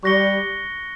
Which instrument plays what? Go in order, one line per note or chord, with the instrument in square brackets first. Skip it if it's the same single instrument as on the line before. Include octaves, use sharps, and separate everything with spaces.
[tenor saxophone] G3 [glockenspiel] C#6 F#6 A#6 C#7 G7